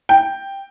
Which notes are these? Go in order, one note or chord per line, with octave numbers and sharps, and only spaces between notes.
G5